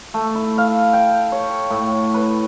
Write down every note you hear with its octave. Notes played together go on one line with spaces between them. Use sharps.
A3
E4
F5
G5
C#5
A2
B4